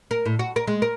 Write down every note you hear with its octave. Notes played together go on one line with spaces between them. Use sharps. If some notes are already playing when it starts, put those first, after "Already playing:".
A#4
A2
F#4
A#4
G#3
A#4